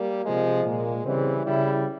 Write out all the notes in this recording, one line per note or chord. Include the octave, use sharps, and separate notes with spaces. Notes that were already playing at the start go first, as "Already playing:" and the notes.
Already playing: G3 A#3
C3 F3 G#3
A#2 G#3 A#3
C#3 E3 G3 C4
C#3 G3 E4